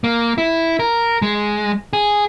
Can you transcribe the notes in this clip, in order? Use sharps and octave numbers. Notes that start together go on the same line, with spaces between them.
A#3
E4
A#4
G#3
G#4